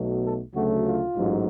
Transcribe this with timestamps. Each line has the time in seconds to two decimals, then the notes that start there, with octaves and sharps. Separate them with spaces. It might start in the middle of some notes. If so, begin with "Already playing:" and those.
Already playing: B1 B2 F#3 A3
0.23 A4
0.54 D2 C#3 F#3 A3 F#4
0.85 F4
1.16 A1 G#2 F#3